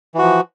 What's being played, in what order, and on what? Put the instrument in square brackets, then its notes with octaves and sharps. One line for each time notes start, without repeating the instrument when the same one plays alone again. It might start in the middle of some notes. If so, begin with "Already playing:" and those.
[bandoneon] E3
F#4
F3